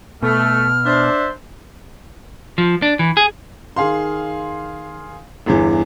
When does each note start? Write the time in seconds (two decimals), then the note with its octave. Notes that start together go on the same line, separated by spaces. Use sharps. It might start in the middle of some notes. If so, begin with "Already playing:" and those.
0.22 B2 A3 F6
0.85 D4 C5 E5
2.58 F3
2.82 D4
2.99 E3
3.17 G#4
3.76 D#3 G#4 F5 C6
5.46 G1 E2 E3